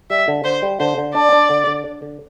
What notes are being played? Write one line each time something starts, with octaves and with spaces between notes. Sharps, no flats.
G3 E5
D3
D3 C5
G3
D3 C5
D3
D4 D5
D4
D3
D3
D4
D3